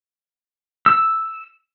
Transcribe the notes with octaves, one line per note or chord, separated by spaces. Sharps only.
E6